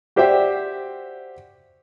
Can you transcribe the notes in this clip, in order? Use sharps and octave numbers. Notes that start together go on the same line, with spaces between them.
F#4 G4 C5 D5 E5 G5